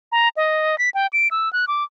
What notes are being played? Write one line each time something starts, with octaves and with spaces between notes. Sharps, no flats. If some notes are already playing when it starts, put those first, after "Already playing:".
A#5
D#5
B6
G5
D7
E6
F#6
D6